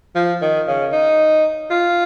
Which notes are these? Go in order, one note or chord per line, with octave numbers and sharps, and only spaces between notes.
F3
D#3
C#3
D#4
F4